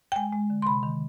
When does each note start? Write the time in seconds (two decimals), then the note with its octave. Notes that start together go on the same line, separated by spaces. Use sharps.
0.12 G5
0.16 G#3 G#5
0.33 G#3
0.50 D3
0.62 C6
0.66 C3 B5
0.83 D#3